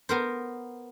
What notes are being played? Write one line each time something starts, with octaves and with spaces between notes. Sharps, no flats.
B3 A#4 C5